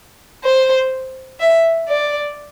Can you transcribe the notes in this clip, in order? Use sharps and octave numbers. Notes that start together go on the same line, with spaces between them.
C5
E5
D5